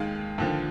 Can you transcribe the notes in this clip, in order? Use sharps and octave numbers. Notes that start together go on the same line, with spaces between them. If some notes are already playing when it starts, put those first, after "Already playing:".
Already playing: D#2 D#3 G#3 F5
D#2 D3 F3